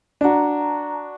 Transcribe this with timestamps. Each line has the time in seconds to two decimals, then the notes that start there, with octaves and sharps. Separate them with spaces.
0.21 D4 F#4 A5 A#5